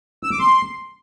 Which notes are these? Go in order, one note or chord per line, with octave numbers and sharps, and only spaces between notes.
E6
D6
C6